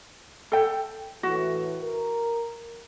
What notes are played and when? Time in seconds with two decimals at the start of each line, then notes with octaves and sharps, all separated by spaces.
0.52 A4 G5
1.23 A2 E3 F#4
1.82 A#4